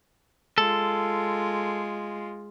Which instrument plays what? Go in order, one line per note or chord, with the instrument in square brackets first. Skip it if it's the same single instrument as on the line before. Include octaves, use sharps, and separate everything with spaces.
[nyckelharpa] G#3 F4 [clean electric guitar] A4